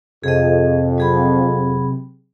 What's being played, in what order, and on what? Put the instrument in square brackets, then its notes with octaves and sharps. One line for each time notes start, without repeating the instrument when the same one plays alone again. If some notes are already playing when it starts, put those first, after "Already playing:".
[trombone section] F2 [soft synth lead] C3 [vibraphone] G#4 D#5
[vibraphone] F#3 G#4 B5